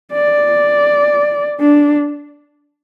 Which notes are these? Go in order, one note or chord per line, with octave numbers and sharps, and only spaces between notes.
D5
D4